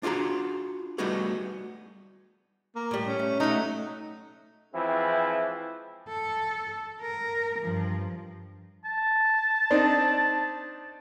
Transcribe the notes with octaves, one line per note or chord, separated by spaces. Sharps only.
D4 F4 F#4 G#4 A#5
G3 A3 B3 D#4 F#4 G#4
A#3
A2 G3
C#4
A3
F#3 A3 D#4
E3 F3 G#3 C4 E4
A4
A#4
G2 F3
A5
C4 D4 D#4